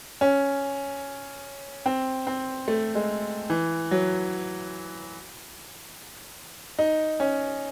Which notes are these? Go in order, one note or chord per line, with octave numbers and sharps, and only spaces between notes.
C#4
C4
C4
A3
G#3
E3
F#3
D#4
C#4